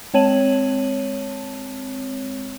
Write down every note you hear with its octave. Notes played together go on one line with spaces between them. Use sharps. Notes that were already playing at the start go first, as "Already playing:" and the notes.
G#3 C4 C#5 A5 D#7 F#7